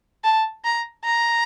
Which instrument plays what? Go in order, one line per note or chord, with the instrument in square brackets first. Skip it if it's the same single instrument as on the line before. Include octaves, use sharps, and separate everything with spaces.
[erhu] A5
A#5
A#5